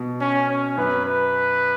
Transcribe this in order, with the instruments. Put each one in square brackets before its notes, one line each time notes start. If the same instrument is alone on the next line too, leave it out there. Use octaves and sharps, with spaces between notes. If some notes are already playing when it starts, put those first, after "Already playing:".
Already playing: [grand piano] B2
[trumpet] C#4
C#4
[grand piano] F#2 [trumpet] B4
[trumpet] B4